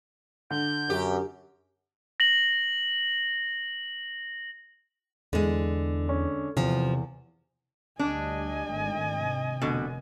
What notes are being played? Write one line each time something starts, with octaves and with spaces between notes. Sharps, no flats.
D3 G6
F#2 G4
A#6 F#7
E2 D3 G#3
C#4
E2 C3 F3
D2 G3 D4 D#5 G#5
G#1 A3
C3
F1 B2 D3